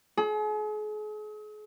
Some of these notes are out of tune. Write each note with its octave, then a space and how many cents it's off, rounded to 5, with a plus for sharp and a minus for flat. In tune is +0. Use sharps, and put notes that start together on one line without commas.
G#4 +40